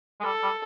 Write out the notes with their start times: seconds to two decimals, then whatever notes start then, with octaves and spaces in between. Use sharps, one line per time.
0.20 G#3
0.24 G3 A4
0.43 G3